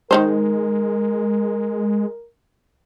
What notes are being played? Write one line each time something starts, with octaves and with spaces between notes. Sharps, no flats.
D#3 G#3 D#4 A#4 C5